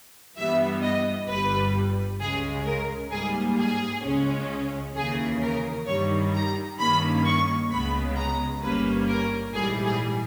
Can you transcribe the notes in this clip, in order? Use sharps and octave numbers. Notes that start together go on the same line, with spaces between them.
G2 E3 G3 B3 E5
D#5
G1 G2 G3 B4
C#2 C#3 G#3 G#4
A#4
G#2 G3 A#3 G#4
G#4
C#2 C#3 G#3 C#4
D#2 C#3 E3 G#4
A#4
G2 D#3 G3 C#5
A#5
G2 D#3 A#3 C#4 B5
C#6
C#2 C#3 G#3 B3 B5
A#5
G1 G2 G3 A#3 C#4 B4
A#4
A#1 G#2 E3 G3 G#4
G#4